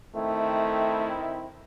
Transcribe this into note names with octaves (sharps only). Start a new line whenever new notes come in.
D#3 A3 C4 E4